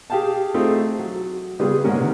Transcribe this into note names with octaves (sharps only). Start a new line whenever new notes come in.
G4 G#4 F5 G5 A5
A3 C4 D#4 F4 G#4
F#3
C#3 G3 B3 F4 G4 G#4
G#2 D3 A#3 B3 C#4
C3 D#3